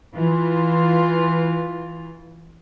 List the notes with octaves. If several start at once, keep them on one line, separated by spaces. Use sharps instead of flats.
E3 F4